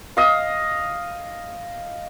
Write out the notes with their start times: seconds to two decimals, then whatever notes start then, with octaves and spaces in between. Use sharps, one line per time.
0.17 D#5 F5